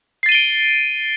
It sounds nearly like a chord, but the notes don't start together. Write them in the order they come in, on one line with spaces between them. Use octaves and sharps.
C7 A6 D#7 G7 D7